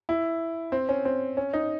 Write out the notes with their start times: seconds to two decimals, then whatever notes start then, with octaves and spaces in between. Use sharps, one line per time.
0.09 E4
0.72 C4
0.89 C#4
1.05 C4
1.37 C#4
1.53 D#4